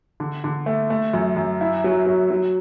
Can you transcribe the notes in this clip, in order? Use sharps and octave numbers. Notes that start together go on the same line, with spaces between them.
D3
D3
A3
A3
F#2
F#2
E4
F#3
F#3
F#3